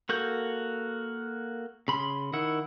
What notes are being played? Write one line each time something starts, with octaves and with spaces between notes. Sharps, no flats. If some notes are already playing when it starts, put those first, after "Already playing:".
A#3 F#4 A4 G6
C#3 B5 C6
D#3 E4 F#5